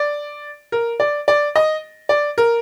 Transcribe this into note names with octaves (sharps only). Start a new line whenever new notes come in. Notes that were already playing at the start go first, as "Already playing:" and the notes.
Already playing: D5
A#4
D5
D5
D#5
D5
A#4